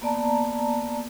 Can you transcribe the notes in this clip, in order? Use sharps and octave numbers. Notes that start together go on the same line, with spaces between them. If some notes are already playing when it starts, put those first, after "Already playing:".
A#3 B3 D5 A5 A#5